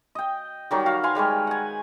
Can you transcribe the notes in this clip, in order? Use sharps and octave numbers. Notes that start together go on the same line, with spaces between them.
D#5 G5
D#3 F#3 G3
F#4 F5
B4 F5 G#5 C6
G3 G#3 B4 C#5
F#5 G#5